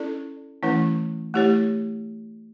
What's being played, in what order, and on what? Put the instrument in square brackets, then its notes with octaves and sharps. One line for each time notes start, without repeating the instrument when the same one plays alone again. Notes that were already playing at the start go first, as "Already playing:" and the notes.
Already playing: [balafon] C#4 E4 A4 D5
E3 A3 C#4 E4 B4
A3 E4 G4 C#5